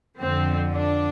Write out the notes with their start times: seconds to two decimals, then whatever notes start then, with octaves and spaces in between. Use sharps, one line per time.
0.19 F2 D3 F3 C4
0.72 D4